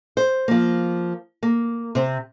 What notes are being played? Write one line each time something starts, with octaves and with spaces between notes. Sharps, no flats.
C5
F3 A#3
A#3
C3 C4